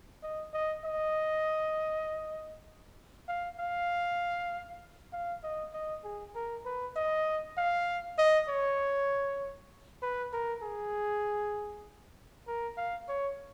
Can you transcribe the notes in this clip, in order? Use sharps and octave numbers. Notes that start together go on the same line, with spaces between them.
D#5
D#5
D#5
F5
F5
F5
D#5
D#5
G#4
A#4
B4
D#5
F5
D#5
C#5
B4
A#4
G#4
A#4
F5
C#5